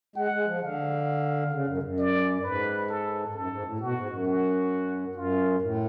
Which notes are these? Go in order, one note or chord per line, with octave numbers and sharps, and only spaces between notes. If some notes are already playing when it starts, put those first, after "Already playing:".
G#3 F#5
G#3
F3
D3 F5
C#3
F#2
F2
F#2
D5
G#2 B4
A4
G#2
F#2 A4
G#2
A2
B2 F#4
G#2
F#2
F#4
F#2 F4
A2